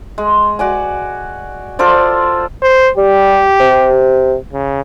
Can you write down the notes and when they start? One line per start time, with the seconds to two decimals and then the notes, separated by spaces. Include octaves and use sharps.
0.18 G#3
0.59 F#4 D5 G#5
1.79 F4 A4 C5 D5
2.62 C5
2.97 G3 G4
3.60 C3
4.53 C#3